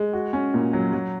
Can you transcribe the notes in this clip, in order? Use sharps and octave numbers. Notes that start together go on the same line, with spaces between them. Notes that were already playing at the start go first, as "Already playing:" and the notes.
Already playing: G#3
F#4
C#4
A#2
F#3
F#3